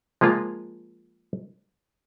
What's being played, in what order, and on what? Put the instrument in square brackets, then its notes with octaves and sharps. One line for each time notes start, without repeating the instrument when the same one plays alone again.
[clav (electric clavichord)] F3 G#3 A#3 F4